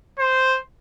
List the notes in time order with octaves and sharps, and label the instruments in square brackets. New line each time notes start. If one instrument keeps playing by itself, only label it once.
[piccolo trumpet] C5